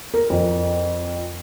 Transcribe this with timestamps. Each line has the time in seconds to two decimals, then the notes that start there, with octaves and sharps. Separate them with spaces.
0.14 A#4
0.30 F2